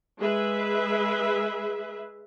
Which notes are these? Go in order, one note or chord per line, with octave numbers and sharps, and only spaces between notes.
G#3 G#4 B4 E5